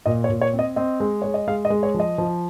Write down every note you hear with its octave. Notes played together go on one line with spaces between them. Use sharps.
A#2 D#5
C#5
A#2
C#5
C4
D#5
C4 D#5
G#3
G#3 C#5
D#5
G#3 F5
D#5
G#3
C#5
F3
D#5
F3